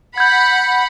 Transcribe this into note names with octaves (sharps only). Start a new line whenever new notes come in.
F#5 B5 G6 G#6